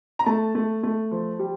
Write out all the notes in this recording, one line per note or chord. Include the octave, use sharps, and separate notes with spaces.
A#5
A3 A5
A3
A3
F3
G3